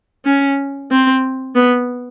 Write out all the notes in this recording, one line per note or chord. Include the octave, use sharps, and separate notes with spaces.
C#4
C4
B3